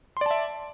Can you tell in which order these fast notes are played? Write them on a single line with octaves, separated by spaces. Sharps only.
C6 D5 A5 E5